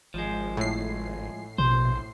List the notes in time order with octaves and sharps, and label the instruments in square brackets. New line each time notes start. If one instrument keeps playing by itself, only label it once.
[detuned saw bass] G#1 [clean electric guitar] F3 G#3
[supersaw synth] A2 C7
[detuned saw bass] A#1 [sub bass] B2 [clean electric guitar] C5